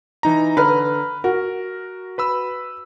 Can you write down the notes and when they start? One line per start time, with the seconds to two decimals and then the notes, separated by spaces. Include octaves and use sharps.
0.23 E3 D#4 A#5
0.57 D3 B4 A#5 F6
1.24 F#4 A#4
2.18 B4 B5 E6